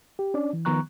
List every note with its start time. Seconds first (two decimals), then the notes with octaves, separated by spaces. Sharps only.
0.19 G4
0.34 C#4 D4 D5
0.53 E3
0.65 D#3 F3 B3 A#5 C#6 F#6